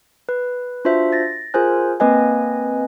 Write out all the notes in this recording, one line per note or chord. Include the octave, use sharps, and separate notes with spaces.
B4
D4 F4 F#4 C5 E5
A6 A#6
F4 G#4 A#4 C5 G#5 F#6
A#3 C4 B4 D#5 G#5